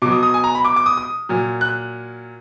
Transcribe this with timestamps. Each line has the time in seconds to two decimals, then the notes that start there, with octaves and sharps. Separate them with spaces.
0.02 B2 F#3 D6
0.12 D#6
0.23 D#6
0.34 G#5
0.44 A#5
0.55 B5
0.65 D6
0.76 D6
0.86 D#6
0.98 D#6
1.29 A#2 F#3
1.61 F#6